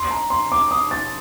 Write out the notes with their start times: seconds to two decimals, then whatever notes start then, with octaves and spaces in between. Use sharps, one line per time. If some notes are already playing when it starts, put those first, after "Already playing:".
Already playing: C6
0.11 A#5
0.30 C6
0.52 D6
0.71 D#6
0.91 A6